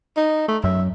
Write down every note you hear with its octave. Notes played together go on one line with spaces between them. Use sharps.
D#4
A3
F#2 E5